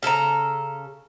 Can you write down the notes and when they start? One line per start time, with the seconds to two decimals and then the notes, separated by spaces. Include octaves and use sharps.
0.03 C#3 A4 B4 A#5